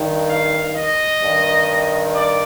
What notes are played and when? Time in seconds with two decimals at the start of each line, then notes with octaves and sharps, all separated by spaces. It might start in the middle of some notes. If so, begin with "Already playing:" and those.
Already playing: G2 D#3
0.29 F5
0.75 D#5
1.22 G2 D#3
2.14 D5